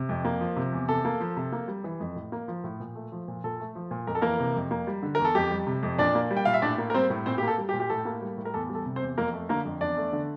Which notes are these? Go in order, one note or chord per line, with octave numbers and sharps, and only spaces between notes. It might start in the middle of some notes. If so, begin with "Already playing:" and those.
Already playing: C3
F2
A#3
F3
C3
E2
C3 A4
A#3
F3
C3
A#3
G3
E3
F2
A2
A#3
F3
A2
A#2
A3
F3
A#2
A#2 A4
A3
F3
A#2
F2 A#4
A4
E3 A#3 A#4
C3
F2
A#3
G3
D3
E2 A#4
A4
F2 G4
G3
C3
F2
A#2 D4 D5
A#3
G3
G5
A#2 F5
E5
A2 D4 D5
A#3
A#4
G3 C4 C5
A2
A#2 C4 C5
A#3 G4
A4
G3
G4
A#2
G4
A2 A4
A#3
G3
A2
A#4
E2 A4
G3
A4
C3
C4 C5
E2
F2 A#3 A#4
A3
D3 A#3 A#4
F2
E2 D4 D5
A3
D3